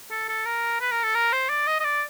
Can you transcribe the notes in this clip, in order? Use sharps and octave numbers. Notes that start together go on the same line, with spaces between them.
A4
A4
A#4
B4
A#4
A4
A#4
C5
D5
D#5
D#5
D5